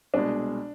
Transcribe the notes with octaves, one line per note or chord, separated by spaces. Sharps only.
C2 B2 G#3 D4